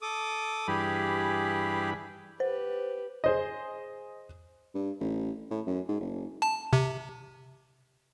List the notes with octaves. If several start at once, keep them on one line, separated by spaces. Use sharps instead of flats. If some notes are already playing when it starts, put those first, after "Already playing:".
A4 D6 D#6
G2 E3 G4 G#4 B5
G4 B4 C5
G#4 C5 D#5
G2
A1
A2
F#2
G#2
F#1
A5
C3